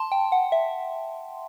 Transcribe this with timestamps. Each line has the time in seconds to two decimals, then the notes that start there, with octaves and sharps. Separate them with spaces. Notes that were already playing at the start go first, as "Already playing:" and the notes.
Already playing: A5 C6
0.12 G5
0.32 F#5
0.52 E5